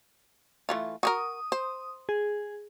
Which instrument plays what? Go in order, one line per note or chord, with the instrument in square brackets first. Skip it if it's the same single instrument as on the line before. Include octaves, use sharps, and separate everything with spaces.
[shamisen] E3 A3 F4
[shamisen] F#4 G4 A#4 [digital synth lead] D#6
[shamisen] C5
[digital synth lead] G#4